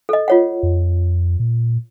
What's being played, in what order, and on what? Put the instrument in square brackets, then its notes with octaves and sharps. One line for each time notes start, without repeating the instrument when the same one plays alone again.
[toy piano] A4 D#5
F4 C#5 F#5
[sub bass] F2
A#2